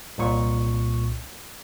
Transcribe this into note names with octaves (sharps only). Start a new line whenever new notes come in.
C2 A#2 C#6